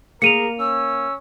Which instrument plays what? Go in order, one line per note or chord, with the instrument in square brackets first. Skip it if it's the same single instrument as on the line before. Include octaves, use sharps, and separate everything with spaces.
[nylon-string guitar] A#3 [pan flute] G#4 [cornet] A#4 [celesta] C#7 D#7 F7
[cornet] C#4 [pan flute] E6